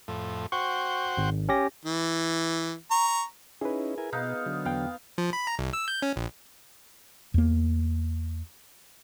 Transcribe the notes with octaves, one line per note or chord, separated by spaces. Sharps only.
F2 A2
F#4 C5 G5 C#6
G#1
C#4 G4 A#6
E3
A#5 C#6
C#4 D#4 E4 G#4 B4
E4 A#4 G#5
B2 B3 D#4 F5
D3 F#3
E2 B3 F5 G5
F3
B5
A#5
C2
E6
G6
C#4
A#1
E2 A#3